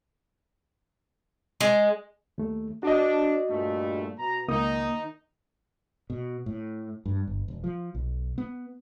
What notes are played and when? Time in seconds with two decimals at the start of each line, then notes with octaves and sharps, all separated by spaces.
1.61 G#3
2.38 D#2 A3
2.83 D4 F#4 D#5
3.50 G2 A#2 A3
4.18 B2 A#5
4.48 C#2 D#3 A#3 D#4 D#6
6.10 B2
6.46 A2
7.06 G2
7.27 G1
7.48 E1
7.64 F3
7.95 B1
8.38 B3